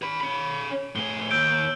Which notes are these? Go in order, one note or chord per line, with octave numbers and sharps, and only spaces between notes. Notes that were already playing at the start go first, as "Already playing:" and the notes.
G#4 B5
C#4 B5
A2 G#4 G7
D#2 E6 G6 D7